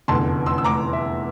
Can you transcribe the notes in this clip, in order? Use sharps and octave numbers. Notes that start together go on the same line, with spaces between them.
F1 E2 D3 A5 C6
C6 E6
E6
A#5 D6
E5